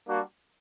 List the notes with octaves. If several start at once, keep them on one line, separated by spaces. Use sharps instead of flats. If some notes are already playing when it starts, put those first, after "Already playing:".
G3 A#3 D4 F#4